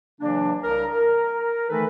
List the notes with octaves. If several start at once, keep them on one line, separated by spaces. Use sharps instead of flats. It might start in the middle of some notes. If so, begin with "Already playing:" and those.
C#3 E3 F#3 A#3 D4
C2 C#3 A#4
A#4
D#3 E3 A3 D#4 A4 B4